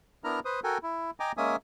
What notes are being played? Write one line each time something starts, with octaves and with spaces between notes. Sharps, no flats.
B3 D4 E4 A#4 A#5 F6
B4 C5 D#6
F#4 A4 A#4 G5 G#5
E4
D#5 G5 G#5 A#5 D6
G#3 A#3 C#4 E5 G#5 D#6